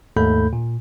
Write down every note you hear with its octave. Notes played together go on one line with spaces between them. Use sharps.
D#2 G#2 A3 A4 B5 G6
A#2